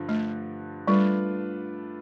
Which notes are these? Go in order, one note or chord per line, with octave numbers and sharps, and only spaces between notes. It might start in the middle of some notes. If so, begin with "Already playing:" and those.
Already playing: G2 D3 F3
A3
G3 A3 D4 F4 B4